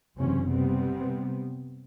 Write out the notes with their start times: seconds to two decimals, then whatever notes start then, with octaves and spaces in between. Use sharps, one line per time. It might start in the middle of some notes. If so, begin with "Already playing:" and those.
0.18 F#1 E2 C3 C4 C#4
0.49 C3 G3 B3 C4